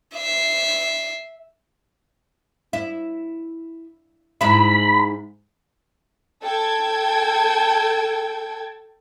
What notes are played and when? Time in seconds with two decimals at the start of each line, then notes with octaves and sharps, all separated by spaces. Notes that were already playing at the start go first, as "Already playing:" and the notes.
0.16 E5 C7
2.73 E4
4.41 G#2 E4 B5
6.43 A4 G5 A5 G#6